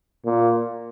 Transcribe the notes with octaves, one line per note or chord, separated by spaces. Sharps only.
A#2